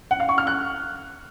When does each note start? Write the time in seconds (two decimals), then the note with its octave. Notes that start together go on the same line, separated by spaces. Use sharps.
0.11 F#5
0.20 F5
0.29 C#6
0.38 F6
0.47 F#6